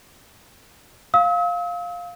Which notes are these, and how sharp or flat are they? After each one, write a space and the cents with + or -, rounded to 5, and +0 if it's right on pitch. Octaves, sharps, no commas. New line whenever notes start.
F5 +5 E6 -45